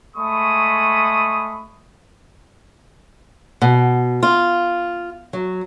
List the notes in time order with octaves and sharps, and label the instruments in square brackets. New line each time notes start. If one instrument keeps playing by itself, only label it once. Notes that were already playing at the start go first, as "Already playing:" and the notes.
[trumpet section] G#3 A3 B5 C#6 D#6
[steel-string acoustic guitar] B2
F4
F#3